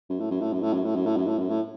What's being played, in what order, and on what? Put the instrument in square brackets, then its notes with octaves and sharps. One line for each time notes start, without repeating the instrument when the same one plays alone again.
[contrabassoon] F#2
A2
F#2
A2
F#2
A2
F#2
A2
F#2
A2
F#2
A2
F#2
A2